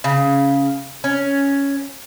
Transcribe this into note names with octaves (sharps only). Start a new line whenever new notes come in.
C#3
C#4